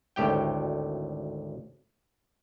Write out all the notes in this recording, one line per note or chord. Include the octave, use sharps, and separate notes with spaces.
G#1 D2 A2 G4 G5